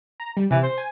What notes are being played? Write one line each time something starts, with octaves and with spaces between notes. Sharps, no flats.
A#5
G3
C3 E3
C5
G#5